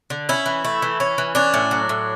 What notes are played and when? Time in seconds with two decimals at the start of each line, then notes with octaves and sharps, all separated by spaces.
0.10 D3
0.29 C#4 E4
0.46 E3
0.65 A3
0.82 E3
1.00 C#4
1.18 E3
1.35 C#4 D4
1.54 A2
1.71 F#3
1.89 A2